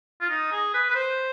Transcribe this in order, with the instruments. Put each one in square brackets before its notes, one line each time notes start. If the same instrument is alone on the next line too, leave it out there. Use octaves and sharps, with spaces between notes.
[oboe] F4
D#4
G#4
B4
B4
C5